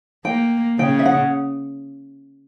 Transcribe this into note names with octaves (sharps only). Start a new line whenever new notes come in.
A#3 G5
C#3 G5
E5
F#5